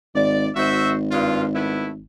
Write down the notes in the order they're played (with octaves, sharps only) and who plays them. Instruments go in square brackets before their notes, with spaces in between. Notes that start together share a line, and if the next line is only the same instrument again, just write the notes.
[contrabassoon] G#1 [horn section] D5
[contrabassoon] G#1 [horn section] F#4 C5 E5
[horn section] G2 F4
A3 B3 E4